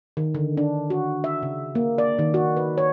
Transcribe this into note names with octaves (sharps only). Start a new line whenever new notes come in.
D#3
D3
D4
F#4
E5
C#3
A#3
D5
D#3
F#4
B4
C#5